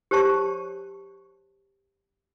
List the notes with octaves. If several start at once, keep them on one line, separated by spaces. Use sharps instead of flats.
G4 C5 C#5 A5 C#6